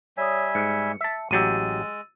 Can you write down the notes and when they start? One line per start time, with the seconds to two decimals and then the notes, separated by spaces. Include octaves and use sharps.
0.17 G3 C#5 E5 G#5 D#6
0.55 G#2 C#7
1.01 E5 A5
1.31 A1 F#3 G#3 G4 E6 A6 D#7